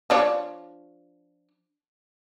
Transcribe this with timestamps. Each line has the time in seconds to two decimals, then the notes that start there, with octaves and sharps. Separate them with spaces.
0.10 F3 D4 C#5